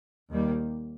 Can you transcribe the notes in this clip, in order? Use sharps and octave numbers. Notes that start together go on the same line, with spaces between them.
D#2 D#3 G3 A#3